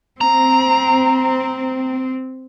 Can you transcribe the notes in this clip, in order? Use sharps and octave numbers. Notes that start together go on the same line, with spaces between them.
C4 A#5